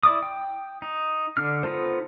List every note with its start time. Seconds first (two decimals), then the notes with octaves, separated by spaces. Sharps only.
0.03 E4 D5 D6 D#6
0.23 G5
0.82 D#4
1.37 D3 D4 F6
1.63 B3 D#4 F4 A4 C5